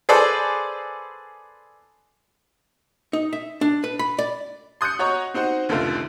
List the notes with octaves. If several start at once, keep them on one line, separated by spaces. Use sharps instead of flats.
G#4 A4 B4 C5 D5
D#4
E5
D4
B4
B5
D5
C6 D#6 F#6 G6 C#7
F#4 C#5 D#5 A#5 C#6
C4 D#4 F#4 C5 F#5
F1 C#2 D3 D#3 A3 F4